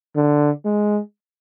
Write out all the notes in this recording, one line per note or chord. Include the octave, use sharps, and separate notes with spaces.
D3
G#3